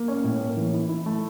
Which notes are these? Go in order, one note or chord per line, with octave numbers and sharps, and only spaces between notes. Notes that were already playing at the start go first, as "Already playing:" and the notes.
Already playing: A#3
C#4
A2
A#3
E3
E4
E4
A3